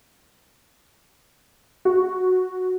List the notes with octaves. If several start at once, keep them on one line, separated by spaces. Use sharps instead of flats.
F#4